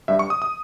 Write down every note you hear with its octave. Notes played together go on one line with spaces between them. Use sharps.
G2 G3 E5
C#6
D#6
D#6